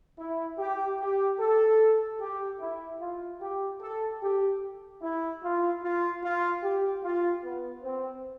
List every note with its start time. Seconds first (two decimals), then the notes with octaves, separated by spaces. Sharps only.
0.19 E4
0.59 G4
1.00 G4
1.40 A4
2.20 G4
2.61 E4
3.00 F4
3.41 G4
3.81 A4
4.21 G4
5.02 E4
5.42 F4
5.83 F4
6.22 F4
6.63 G4
7.04 F4
7.44 B3
7.83 C4